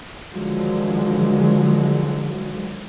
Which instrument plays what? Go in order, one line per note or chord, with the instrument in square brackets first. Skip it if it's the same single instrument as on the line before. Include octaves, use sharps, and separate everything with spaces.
[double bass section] D3 D#3 F3 F#3 G#3